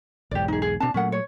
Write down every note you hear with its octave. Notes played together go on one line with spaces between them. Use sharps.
B1 E2 G#2 G4 D5
D#4 G#4
G#4
B2 C4 D4 A5
A#2 F#3 A3 C#4 A#4 F#5
C#5